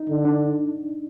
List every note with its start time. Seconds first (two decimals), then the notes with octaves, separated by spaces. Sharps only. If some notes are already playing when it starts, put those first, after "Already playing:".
Already playing: D#4
0.09 D3
0.25 D4